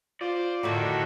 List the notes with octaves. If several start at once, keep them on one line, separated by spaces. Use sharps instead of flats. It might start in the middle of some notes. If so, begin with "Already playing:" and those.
F4 C5 D5
F2 A2 D3 D#3 F#4 D5 E5